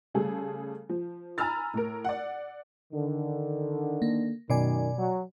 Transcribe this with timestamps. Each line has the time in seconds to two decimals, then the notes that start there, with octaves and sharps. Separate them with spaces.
0.14 C#3 G3 A3 G#4 A4
0.89 F3
1.38 G#5 A#5 B5 E6 F6 A6
1.74 A2 A#4
2.05 D5 F#5
2.93 D3 D#3
4.02 A#3
4.50 F#2 B2 D#3 D5 G#5
4.98 F#3